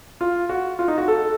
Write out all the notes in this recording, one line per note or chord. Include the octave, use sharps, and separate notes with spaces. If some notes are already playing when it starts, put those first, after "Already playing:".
F4
F#4
F4
D#4
F#4
A4